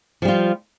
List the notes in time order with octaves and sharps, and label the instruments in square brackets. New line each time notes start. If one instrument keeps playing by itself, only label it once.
[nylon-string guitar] F3
G3
F4